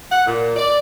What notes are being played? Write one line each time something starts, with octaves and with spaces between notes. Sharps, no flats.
F#5
A#2
D5